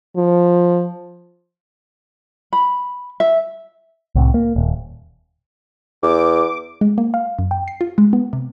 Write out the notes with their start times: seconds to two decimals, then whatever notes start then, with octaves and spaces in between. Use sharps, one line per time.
0.17 F3
2.53 B5
3.20 E5
4.15 C2 A2 C3
4.34 A#3
4.56 D#1
6.03 E2 D6
6.81 G#3
6.98 A#3
7.14 F5
7.38 F#2
7.51 G5
7.68 C7
7.81 F4
7.98 G#3
8.13 B3
8.33 C3